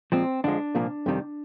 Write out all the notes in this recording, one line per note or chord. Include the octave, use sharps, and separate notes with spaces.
A#2 F3 G#3 C4
F2 D3 F3 G#3 D4
C2 A#2 F3 A#3
F2 C3 D#3 G3